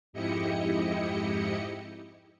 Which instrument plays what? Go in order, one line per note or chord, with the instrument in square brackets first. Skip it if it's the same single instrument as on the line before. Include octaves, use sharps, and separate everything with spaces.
[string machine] F2 G#2 E4 G4 D#5 C#7